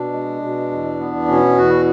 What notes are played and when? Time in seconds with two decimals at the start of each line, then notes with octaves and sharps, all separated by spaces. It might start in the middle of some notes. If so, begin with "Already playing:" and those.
Already playing: B2 D4
0.13 G#3
0.42 B2
0.71 E2
0.99 B3
1.28 B2 C#4
1.57 E2 F#4